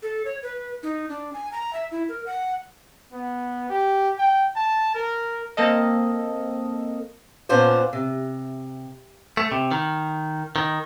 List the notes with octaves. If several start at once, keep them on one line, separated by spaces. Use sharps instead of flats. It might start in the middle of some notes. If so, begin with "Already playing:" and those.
A4
C#5
B4
D#4
D4
G#5
A#5
E5
E4
A#4
F#5
B3
G4
G5
A5
A#4
A#3 C4 A4 D#5
A#2 B3 C#4 D4 F4 C5
C3
A3
C3
D#3
D#3